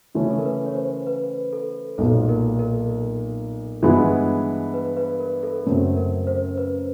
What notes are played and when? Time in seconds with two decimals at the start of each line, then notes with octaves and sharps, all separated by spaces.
0.15 C#3 E3 A3 C#4
0.30 A4
0.38 A#4
0.45 B4
0.66 C#5
0.75 C5
1.07 B4
1.53 A4
1.98 B1 A#2 F#3 A4
2.29 A#4
2.59 A#4
3.82 G2 E3 G#3 B3 E4
4.74 B4
4.97 B4
5.19 A#4
5.43 A4
5.66 F#2 C#3 F#3 A3 C4 A#4
5.96 A#4
6.27 C5
6.58 B4